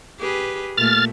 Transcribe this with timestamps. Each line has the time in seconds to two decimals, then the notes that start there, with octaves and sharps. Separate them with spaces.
0.19 G4 G#4 B4
0.78 A#2 A3 F6 A6